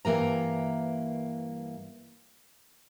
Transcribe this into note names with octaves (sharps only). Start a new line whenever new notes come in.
G2 E3 A#3 A#5